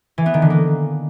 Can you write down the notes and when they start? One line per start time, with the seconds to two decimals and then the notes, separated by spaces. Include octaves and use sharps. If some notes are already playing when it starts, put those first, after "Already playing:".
0.18 E3
0.26 B3
0.34 D#3
0.42 D3
0.50 A#3